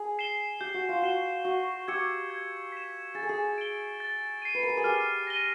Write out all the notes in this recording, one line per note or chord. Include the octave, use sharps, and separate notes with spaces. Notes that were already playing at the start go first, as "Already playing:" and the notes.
Already playing: G#4
C7 E7 G7
G4 G6
F#4
F4
F#4 C7 E7 G7
F#4 C#6
G4 E6 G#6 C#7 E7
G#6
B6 E7
G#4 A6
A4
G#4
D7 G7
A6
C7 D#7
B4
A#4
A4
G#4
G4 F6
A#6 D#7 G7